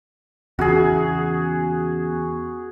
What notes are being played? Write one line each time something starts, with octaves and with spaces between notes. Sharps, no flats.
E2 C#3 F#4 G#4